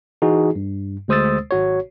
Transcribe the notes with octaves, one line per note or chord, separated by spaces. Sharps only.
E3 D#4 F#4 G#4
G2
D2 G#3 C5 D#6 E6 A6
G#1 F#4 C#5